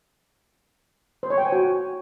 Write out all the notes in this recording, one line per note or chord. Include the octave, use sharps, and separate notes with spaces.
C5
C#5
G5
G#5
F#4